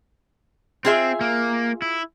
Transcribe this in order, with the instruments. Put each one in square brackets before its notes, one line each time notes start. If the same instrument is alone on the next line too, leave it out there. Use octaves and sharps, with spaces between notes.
[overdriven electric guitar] C4 [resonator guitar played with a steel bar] F4 G#4 E5
[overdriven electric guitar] A#3
E4